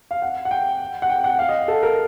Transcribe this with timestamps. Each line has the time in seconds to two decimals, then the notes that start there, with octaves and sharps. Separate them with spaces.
0.11 F5
0.22 F#5
0.45 F#5
0.51 G5
1.02 F#5
1.10 G5
1.24 F#5
1.39 F5
1.49 D#5
1.68 A4
1.83 A#4